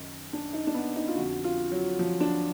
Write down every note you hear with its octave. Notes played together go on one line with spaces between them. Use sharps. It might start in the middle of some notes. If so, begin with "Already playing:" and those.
Already playing: F#2 D#3 D#4
D4
D#4
D4
B3
D#4
F4
F2 D3 F#4
F4
F#3
F3
D4